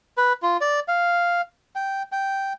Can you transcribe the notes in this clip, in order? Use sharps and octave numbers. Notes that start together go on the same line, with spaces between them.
B4
F4
D5
F5
G5
G5